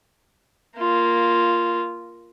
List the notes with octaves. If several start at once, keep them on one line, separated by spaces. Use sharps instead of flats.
A#3 F4